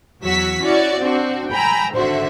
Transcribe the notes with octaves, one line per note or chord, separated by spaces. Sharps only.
E2 F#3 F#4 E6 B6
C#4 E4 F#4 D5
C4 D4 F#4
G5 G#5 A#5 B5 E6
G#1 D3 F#4 C5 E5